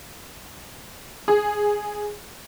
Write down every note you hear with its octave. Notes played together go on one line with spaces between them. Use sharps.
G#4